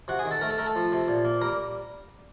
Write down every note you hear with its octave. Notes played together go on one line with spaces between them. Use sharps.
C3 F#4 F#5
G#4 G#5
D#3
A4 A5
A3 A#4 A#5
A4 A5
A3 A#4 A#5
A4 A5
F3
C3
A#2
A#3
G3 A#4 A#5